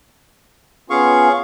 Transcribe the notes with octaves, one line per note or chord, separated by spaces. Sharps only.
B3 C#4 F4 G#4 F5 C#6